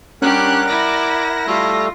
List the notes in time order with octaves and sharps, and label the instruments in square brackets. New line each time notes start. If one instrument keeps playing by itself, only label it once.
[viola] G3 D4 [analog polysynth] C#4 F#6 [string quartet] G4 [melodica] A#4 F#5
[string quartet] E4 [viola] D5 [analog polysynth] A#6
[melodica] G3 A3 A4 [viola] F4